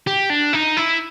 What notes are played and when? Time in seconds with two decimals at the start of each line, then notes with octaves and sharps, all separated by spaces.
0.07 G4
0.30 D4
0.53 D#4
0.77 E4